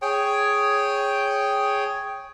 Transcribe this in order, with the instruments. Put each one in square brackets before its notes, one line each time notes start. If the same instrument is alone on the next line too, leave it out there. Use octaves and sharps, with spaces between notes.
[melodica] G#4 C#5 G5